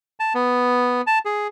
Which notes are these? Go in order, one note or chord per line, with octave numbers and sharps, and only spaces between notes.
A5
B3
A5
G#4